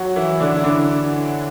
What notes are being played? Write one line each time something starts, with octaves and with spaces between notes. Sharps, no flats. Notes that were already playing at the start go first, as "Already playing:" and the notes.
Already playing: F#3 F#4
E3 E4
D3 D4
E4
D3 D4